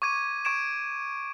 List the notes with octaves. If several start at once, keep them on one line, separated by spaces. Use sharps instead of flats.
C#6 D6 G#6 D#7
C#6 G#6 D7 E7